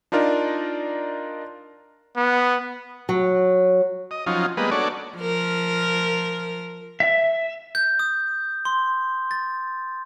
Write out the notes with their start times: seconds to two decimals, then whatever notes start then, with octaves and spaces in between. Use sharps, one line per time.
0.12 D4 D#4 F4 A#4 D5
2.16 B3
3.09 F#3
4.11 D#5
4.26 F3 F#3 C#4 D#4 F4
4.57 G3 G#3 A#3 B3 B4 D#5
4.71 D4 F#4 A4 C#5 D5
5.16 F3 A#4
7.00 E5
7.75 G6
7.99 D#6
8.65 C6
9.31 A6